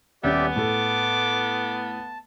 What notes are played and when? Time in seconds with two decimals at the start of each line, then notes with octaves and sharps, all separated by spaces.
0.24 D#1 B3 C#4 G4 D5 E5
0.56 A2 A4 A5 D6